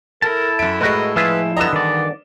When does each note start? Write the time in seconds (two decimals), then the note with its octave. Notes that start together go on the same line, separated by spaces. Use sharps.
0.22 E4 A4 A#4 A5
0.59 F#2 E5 D7
0.81 A2 G#3 F#4 A#4 B4 D#5
1.16 F3 E4 F4 G#4 B4 E5
1.57 G2 D3 B3 D#5 A#5 E7
1.73 D#3 E3 D5